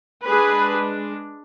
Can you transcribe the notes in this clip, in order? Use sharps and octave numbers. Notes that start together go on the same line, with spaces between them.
G#3 D4 G#4 B4